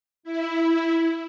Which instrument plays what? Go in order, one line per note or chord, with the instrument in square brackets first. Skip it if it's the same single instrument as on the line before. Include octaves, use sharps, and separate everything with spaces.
[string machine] E4